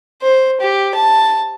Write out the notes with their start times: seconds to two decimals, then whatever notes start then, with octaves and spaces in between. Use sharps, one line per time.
0.22 C5
0.60 G4
0.95 A5